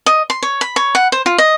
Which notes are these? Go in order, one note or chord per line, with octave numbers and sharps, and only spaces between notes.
D#5
C6
C#5
B5
C#5
F#5
C5
F4
D#5